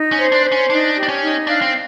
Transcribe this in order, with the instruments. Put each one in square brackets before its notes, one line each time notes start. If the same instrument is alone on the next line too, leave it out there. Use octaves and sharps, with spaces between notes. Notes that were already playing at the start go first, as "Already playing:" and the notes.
Already playing: [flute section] D#4
[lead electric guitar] C#4
[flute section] C5
[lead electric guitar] D4
[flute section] C5
[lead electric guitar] C#4
[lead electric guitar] D4 [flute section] D#4
[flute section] G4
[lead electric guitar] D4
C#4
[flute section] D#4
[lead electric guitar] D4 [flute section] F5
[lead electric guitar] C4